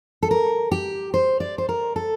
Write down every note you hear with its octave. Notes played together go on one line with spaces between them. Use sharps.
A4
A#4
G4
C5
D5
C5
A#4
A4